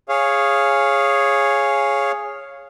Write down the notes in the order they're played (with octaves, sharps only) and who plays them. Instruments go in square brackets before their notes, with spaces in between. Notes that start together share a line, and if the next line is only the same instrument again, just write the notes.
[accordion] G#4 C#5 F5